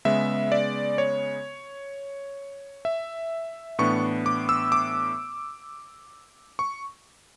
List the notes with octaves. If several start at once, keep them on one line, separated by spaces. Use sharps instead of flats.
C#3 G#3 B3 E5
D5
C#5
E5
A2 E3 B3 D4 C#6
D6
E6
D6
C#6